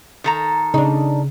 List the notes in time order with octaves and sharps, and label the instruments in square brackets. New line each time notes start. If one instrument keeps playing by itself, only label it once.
[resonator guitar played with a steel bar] D#3 A4 A#5
[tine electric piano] C#3 [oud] D4 D#4